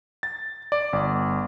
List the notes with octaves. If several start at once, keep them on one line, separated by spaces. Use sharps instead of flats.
A6
D5
G1